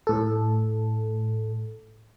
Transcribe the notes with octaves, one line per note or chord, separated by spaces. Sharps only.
A2 A4